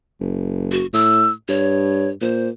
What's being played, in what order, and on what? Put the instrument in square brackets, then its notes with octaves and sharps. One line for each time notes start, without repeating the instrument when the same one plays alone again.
[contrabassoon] F#1
[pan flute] F#4
[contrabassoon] A2 [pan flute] E6
[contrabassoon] G2 [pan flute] C#5
[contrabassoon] A#2 [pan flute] C5